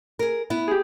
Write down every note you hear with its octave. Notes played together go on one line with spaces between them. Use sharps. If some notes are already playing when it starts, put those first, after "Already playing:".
G#4 A#4
B3 E4
G4 G#4